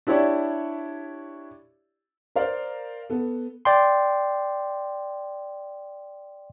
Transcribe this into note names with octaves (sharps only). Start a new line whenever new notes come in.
D4 E4 G4 C#5 D5 E5
A#4 C5 D5 F5
B3 A4
D5 G5 C6